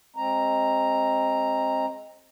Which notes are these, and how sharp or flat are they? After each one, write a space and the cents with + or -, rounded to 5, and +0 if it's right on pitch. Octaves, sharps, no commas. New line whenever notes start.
G#3 +0 C4 +25 A#5 +0